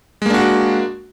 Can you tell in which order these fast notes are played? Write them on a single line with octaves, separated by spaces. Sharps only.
G#3 A#3 D4 F#4